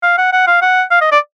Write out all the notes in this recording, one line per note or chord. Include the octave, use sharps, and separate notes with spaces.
F5
F#5
F#5
F5
F#5
F5
D#5
D5